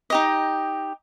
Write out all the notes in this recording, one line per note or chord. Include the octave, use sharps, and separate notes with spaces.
D#4 G4 D#5